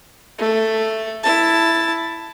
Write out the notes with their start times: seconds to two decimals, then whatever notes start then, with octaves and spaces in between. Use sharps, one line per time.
0.38 A3
1.23 E4 A5